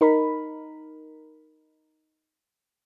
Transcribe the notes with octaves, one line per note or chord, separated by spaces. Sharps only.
D#4 A#4 B5